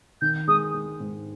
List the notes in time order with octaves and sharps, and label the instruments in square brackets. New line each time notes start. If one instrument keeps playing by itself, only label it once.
[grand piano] D#3 [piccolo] G6
[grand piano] G#3 [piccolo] D#6
[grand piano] G#3
G#2